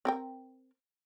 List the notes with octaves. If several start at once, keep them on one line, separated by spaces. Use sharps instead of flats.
C4 A#4 G5